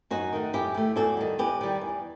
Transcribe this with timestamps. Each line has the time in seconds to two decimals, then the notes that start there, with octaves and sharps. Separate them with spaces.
0.10 F#2 D#4 F#4
0.33 D#3 A3
0.53 F#2 E4 G4
0.74 D#3 A3
0.96 E2 F#4 A4
1.17 D#3 G3
1.38 E2 G4 B4
1.61 D#3 G3
1.81 E2